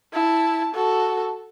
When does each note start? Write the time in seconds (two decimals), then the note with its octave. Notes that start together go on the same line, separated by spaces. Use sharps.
0.13 E4 A5
0.74 F#4 A4